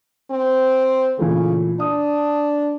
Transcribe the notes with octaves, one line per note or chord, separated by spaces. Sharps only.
C4
A#2 C#3 E3 A3
D4 D#6